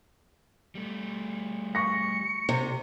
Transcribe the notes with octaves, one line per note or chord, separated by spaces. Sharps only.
G3 A3
C#6 A#6 C#7
C3